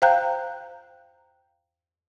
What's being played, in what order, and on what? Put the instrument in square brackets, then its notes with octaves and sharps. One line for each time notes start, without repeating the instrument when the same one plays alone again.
[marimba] C5 F5 G5 A#5 F#6 G6